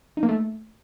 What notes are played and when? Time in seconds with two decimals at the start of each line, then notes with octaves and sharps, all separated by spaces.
0.17 D#4
0.23 A#3
0.29 A3